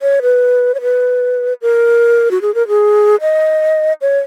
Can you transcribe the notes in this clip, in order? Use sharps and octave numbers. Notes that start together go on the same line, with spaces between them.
C#5
B4
C#5
B4
A#4
F#4
G#4
A#4
G#4
D#5
C#5